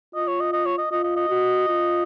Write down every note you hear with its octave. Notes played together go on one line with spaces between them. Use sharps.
F4 D#5
C#5
D#5
D#5
C#5
D#5
F4 D#5
D#5
D#5
F#4
F4